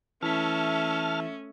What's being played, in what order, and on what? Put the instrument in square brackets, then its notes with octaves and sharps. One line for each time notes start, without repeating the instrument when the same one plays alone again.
[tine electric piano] E3 E4 B6 [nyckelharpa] A3 E5 [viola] C#4 [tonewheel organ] A5 F6